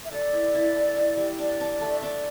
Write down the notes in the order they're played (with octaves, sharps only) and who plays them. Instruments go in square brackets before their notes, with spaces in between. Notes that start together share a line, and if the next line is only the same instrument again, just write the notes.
[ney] E5
[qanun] A4 [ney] D5
[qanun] E4
E4
A4
E4
G3
[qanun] D4 [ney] D5
[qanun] D4
A3
[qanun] D4 [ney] D5